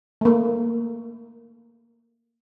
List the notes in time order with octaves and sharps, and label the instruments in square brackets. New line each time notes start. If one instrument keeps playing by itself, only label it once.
[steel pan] A3 A#3